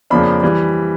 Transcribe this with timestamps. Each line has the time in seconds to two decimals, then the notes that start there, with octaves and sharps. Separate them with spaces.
0.10 F2 C#3 F3 A#3 D4 B5
0.43 E3 G3